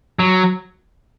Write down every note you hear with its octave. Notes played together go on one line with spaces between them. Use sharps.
F#3